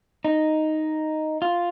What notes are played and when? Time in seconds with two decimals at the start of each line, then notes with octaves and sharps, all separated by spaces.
0.25 D#4
1.42 F4